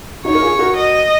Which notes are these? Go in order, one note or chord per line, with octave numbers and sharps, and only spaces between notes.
D#4 F#4 C#5
A#4
F4 G#4
F#4 A#4
D#5